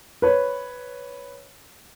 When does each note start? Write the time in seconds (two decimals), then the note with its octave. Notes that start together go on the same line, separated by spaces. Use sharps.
0.22 B4 C#5